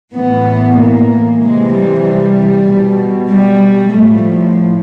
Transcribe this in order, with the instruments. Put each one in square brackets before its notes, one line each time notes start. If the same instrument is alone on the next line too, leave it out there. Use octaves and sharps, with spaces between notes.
[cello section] A2 E3 B3
A#3
C3 E3 G#3
G3
G3
B2
G3
A2 F3 A3